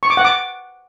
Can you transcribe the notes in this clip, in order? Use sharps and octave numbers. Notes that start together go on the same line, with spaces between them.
C#6
D6
F#5
D6